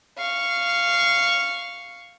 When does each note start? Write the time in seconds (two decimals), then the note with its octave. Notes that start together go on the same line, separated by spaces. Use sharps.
0.18 F5 C#6